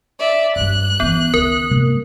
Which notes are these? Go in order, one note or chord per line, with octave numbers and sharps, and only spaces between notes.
D5 E5
G2 G3 F#6
C#2 E3 B3
C#2 D#3 A#4
G#2 C3 G3 A#3